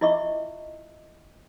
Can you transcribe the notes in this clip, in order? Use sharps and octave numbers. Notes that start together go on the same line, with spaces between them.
E4 F4 D#5 E5 C#6